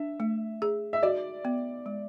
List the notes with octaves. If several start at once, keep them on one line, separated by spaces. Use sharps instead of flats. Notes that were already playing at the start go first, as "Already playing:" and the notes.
Already playing: D4 E5
A3
G#4
E5
F#4 D5
B3
G#3